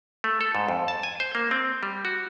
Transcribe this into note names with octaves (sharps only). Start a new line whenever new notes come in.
A3
A4
G#2
F2
A5
G#5
C5
A#3
C4
G3
F#4